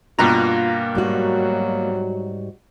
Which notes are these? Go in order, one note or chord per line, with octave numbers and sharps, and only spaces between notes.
G2 B2 A#3 F4 A#5
G#2 F#3 G3 F#4